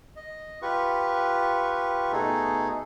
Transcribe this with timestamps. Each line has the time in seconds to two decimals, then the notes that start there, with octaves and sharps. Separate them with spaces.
0.16 D#5
0.62 F4 G4 B4 C#6
2.12 B2 A3 D#4 G#4 A4